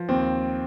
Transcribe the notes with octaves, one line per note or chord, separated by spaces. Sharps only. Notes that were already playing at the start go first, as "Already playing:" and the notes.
Already playing: F3
D#2 C4